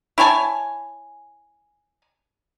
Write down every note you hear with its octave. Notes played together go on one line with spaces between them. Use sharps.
E4 C#5 G#5 A5